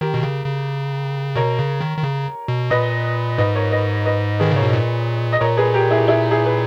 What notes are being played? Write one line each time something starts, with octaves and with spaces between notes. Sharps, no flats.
D#3 G4 A#4
B2
C#3
C#3
B2 A#4 C#5
C#3
D#3
D#3
C#3
B2
A#2 B4 D#5
G#2 B4 D#5
A#4 C#5
B4 D#5
B4 D#5
D#3 G#4 B4
C#3 A#4 C#5
B2
A#2
D#5
A#2 A#4 C#5
G#4 B4
G4 A#4
E4 G#4
E4 G#4
E4 G#4
B4